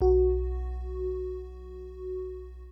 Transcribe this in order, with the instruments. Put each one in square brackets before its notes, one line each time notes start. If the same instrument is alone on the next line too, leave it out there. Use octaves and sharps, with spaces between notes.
[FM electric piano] B1 F#4